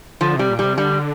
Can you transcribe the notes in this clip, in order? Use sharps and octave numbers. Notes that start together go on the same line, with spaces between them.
D3 F3
C3 G3
A#2
C3 G3
D3 G3